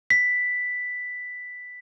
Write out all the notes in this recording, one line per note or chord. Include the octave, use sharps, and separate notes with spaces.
B6